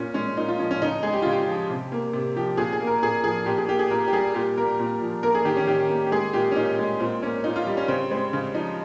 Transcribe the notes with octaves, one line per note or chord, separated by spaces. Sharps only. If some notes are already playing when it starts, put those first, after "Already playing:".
Already playing: A#2 C#4
G#3 C#4
A#2 D#4
F4
F3 C#4
C#4
C#3 D#4
G#3 G#4
G4
C#3 F4
G4
F3
C3
A#3
C3
F3 G4
A#2 G#4
G#4
A#3
A#4
A#2 G#4
F3 G#4
A#2 G4
G#4
A#3 G4
G#4
A#2 A#4
G4
G3 G#4
A#2 G4
A#3 A#4
A#2
F3
A#3 A#4
G#4
D#3 G4
C#4
D#3 G4
A#3
G4
G#3 G#4
A#2 G4
C#4
A#2 D#4
G#3
A#2 C4
A#3 C#4
A#2 D#4
F4
G3
C#4
C#3 C4
G#3 C4
C#3
F3 D#4